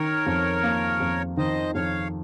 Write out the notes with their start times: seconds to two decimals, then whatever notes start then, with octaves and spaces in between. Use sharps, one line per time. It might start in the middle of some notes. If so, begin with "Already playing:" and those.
Already playing: D#3 A#4 C#5
0.26 F2
0.63 A#3
1.00 F2
1.37 D#3 C5 D#5
1.75 F2 C#5 F5